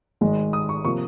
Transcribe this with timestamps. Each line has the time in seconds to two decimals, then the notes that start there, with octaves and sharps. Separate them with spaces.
0.21 G#1 G#2 D#3 G#3
0.53 D#6
0.69 C#6
0.85 C3 F3 A#3 C#6